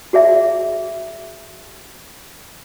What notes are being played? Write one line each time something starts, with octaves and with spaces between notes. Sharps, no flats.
F#4 G#4 D5 E5